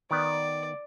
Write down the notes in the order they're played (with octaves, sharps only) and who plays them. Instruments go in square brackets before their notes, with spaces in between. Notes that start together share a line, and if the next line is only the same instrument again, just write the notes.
[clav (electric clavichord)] D#3 B3 [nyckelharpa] D5